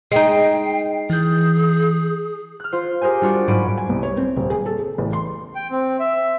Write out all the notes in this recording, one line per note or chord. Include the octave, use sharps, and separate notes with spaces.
G#3 D#4 G5 C7
E3 G#4 G6
F6 F#6
F4 C5
G4 G#4 A#4 C5 G#5
G3 D4 F4 F#4
G#2 F#3 C#4 B5 D7
G#5
C2
C#5
C4
D#1
G#4
A4
A4
A1
C6
G5
C4
E5